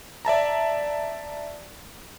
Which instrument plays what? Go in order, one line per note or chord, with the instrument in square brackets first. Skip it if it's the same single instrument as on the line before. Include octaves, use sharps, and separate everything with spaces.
[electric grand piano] D5 E5 A5 A#5